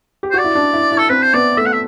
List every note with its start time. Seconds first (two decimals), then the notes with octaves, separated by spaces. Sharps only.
0.23 G4
0.31 C5
0.34 F#4 D5
0.44 E4
0.55 D4
0.74 E4
0.92 E4
0.98 A4
1.09 C4 B4
1.22 C5
1.33 B3 D5
1.57 A3 E5
1.66 F#5
1.73 E5